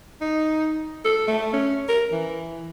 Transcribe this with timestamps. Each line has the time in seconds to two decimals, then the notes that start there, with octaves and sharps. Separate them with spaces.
0.21 D#4
1.05 A4
1.28 A3
1.53 C#4
1.89 A#4
2.12 E3